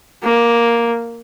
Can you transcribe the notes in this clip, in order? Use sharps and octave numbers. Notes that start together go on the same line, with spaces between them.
A#3